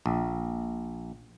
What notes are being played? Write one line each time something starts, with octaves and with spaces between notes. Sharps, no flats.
A#1